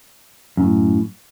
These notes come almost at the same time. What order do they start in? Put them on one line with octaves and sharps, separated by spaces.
F#2 C#3 A2